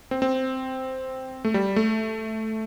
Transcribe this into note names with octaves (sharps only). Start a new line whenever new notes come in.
C4
C4
A3
G3
A3